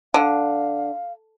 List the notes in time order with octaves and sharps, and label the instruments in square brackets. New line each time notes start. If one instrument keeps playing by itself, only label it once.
[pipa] D3 [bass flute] F5